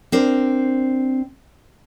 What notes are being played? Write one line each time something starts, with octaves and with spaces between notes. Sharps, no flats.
C4 D4 A#4 C5